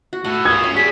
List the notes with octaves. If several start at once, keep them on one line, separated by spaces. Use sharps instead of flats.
F#4
A2 F#5
E4 F4 D#6 G#6
C#4 C6
F#3 G3 G#4 B6